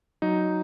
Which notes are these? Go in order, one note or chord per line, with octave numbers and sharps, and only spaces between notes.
F#3 D#4